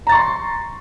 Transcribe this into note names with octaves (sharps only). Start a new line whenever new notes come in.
A#5 C6 C#6 A6